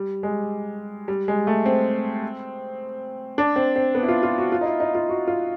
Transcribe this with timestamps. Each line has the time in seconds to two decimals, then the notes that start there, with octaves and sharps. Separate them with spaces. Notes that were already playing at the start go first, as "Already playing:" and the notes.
Already playing: G3
0.23 G#3
1.08 G3
1.28 G#3
1.47 A3
1.66 C4
3.38 D4
3.56 C4
3.76 C4
3.95 B3
4.03 E4
4.09 F4
4.23 F4
4.38 F#4
4.52 F4
4.61 D#4
4.66 E4
4.80 D#4
4.95 F4
5.09 F#4
5.28 F4